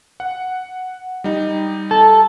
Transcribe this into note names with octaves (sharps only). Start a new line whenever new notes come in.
F#5
G3 D#4
A4